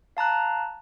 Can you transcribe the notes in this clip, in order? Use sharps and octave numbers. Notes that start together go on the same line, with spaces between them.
F5 A5 A#5 F#6